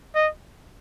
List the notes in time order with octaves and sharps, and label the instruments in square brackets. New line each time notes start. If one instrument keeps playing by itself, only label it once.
[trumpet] D#5